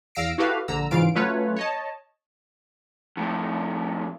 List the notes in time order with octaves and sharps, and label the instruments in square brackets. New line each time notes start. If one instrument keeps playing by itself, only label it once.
[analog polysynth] E2 F5 E6 A#6 C7 D7
E4 F#4 G4 A4 B4 F5
A#1 D3 A#5 E6
G#2 C#3 E3 F4 F5 D7
F#3 A3 C#4 F4 B4 C#5
C#5 D#5 A5
[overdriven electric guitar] F2 A2